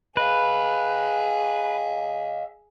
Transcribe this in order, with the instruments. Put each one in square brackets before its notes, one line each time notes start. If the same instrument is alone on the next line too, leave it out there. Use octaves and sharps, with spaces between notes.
[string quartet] G#4 [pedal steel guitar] B4 [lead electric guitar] D#5 F5